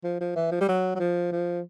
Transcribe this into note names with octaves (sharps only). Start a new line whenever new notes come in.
F3
F3
E3
F3
G3
F#3
F#3
F3
F3